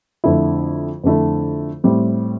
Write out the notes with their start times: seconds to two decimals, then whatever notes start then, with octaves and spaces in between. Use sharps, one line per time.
0.24 F2 D3 A3 E4
1.04 F2 D3 A3 E4
1.84 A2 G3 C4